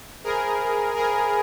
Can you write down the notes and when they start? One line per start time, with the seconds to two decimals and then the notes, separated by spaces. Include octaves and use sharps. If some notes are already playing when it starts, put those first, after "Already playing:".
0.24 G#4 A#4 C5 E5 G#5 B5
0.96 G#4 A#4 C5 E5 G#5 B5